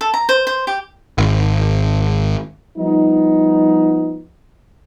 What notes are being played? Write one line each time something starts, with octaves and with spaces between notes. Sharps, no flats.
A4
A#5
C5
C5
G4
G#1
F3 G3 B3 D#4